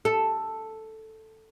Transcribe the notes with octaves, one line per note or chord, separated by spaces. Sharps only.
A4